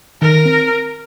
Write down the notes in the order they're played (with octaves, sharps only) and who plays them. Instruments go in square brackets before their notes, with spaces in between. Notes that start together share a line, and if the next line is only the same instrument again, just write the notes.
[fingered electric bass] D#3 [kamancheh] A#4
[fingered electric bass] C4